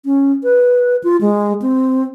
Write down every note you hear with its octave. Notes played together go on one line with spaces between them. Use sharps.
C#4
B4
F4
G#3
C4